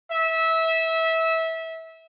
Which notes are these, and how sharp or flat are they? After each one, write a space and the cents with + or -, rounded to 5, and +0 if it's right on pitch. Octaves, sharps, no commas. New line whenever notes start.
E5 -20